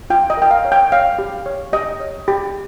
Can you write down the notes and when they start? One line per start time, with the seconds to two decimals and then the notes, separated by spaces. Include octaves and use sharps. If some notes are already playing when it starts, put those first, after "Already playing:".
0.10 F4 G5
0.30 D#5
0.37 A#4 G5
0.51 F5
0.65 C#5
0.72 G5
0.92 C#5 F5
1.19 G4
1.46 C#5
1.73 G4 D#5
2.00 C#5
2.28 G4